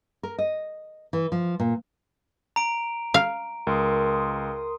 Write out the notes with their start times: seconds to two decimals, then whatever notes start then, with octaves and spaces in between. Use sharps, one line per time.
0.23 A#4
0.39 D#5
1.13 E3
1.32 F3
1.60 A#2
2.56 A#5 D7
3.14 F5
3.67 C#2 A#4 C6 D#6